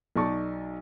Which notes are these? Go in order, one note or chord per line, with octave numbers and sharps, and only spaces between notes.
B1 D#4 D5 A5 C#6